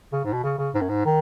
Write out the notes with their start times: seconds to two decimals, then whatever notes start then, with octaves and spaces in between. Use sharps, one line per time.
0.13 C#3
0.24 G#2
0.33 B2
0.43 C#3
0.58 C#3
0.74 G#2
0.81 F#2
0.89 G#2
1.05 D#3